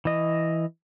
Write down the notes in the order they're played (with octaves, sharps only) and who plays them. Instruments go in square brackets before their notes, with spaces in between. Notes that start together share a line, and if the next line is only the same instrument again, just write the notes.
[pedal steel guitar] E3 D#5